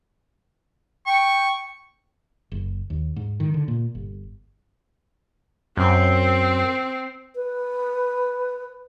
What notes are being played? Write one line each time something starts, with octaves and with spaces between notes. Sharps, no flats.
G5 C#6
F#1
D#2
G#2
D#3
D3
A#2
G1
F#2 C4
B4